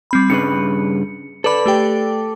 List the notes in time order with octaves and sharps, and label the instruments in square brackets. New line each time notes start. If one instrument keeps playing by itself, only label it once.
[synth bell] G3 C4 B5
[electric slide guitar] G2 C#3 B4 [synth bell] C#7
[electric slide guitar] A4 D5 [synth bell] B4 B5
[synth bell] A3 G4 G5